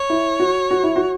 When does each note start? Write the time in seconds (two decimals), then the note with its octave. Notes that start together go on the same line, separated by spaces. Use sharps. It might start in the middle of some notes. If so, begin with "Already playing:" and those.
Already playing: C#5
0.10 E4
0.40 F#4
0.71 F#4
0.83 E4
0.96 F#4